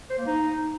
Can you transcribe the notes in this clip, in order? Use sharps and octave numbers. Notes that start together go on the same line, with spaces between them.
C5
A#3
D#4